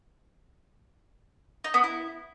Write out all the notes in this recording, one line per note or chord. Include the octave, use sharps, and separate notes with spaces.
D#4
B3
E4